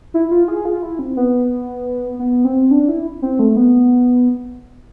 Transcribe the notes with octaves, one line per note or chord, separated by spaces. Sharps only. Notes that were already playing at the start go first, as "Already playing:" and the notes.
E4
F4
G#4
F4
E4
C4
B3
B3
C4
D4
E4
C4
A3
B3